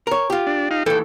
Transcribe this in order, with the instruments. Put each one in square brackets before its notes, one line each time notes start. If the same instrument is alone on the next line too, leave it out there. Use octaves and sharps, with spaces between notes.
[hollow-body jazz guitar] A#4 C#5
F4 G4
[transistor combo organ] D4
D#4 F5
[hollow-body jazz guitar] D#2 E3 [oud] A4 [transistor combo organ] G5